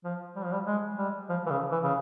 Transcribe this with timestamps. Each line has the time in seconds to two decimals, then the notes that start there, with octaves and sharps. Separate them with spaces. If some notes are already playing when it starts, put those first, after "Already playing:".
0.04 F3
0.36 G3
0.44 F3
0.53 G3
0.67 G#3
0.98 G3
1.29 F3
1.46 E3
1.50 C#3
1.71 E3
1.83 C#3